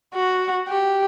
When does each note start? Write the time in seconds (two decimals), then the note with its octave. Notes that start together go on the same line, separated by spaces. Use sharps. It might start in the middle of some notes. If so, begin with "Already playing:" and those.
0.14 F#4
0.68 G4